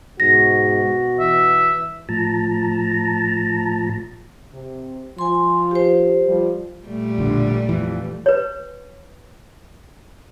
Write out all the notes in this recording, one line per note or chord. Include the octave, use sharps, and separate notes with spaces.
G#2 B2 F#4 A#6
E3 E5
A2 F3 A5 A#5
C3
F3 G#5 C6
G4 C5
F3 G3
A#2 G3 A3
E1 A#1 D3
F2 E3
B4 C#5